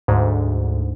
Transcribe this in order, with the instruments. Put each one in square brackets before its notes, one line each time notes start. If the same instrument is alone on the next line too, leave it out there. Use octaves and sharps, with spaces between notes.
[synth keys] D2 G#2